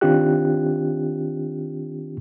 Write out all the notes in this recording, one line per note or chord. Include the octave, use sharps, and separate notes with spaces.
D#3 C4 D4 F4 G4 F#6